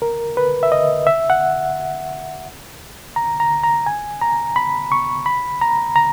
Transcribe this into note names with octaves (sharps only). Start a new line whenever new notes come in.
A#4
B4
E5
D#5
E5
F#5
A#5
A#5
A#5
G#5
A#5
B5
C#6
B5
A#5
A#5